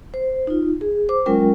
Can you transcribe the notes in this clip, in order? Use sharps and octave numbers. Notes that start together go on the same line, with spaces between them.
C5
D#4 F4
G#4
C5 D6
F#3 G#3 C#4 F4 A#4 G5